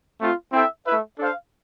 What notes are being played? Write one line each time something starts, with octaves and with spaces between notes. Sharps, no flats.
A3 C4 F4
C4 E4 A4 E5 G5
A3 E4 B4 E5
D4 A4 C5 F5